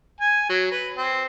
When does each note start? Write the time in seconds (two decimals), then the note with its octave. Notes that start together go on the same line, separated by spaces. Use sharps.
0.21 G#5
0.49 F#3
0.72 B4
0.97 C4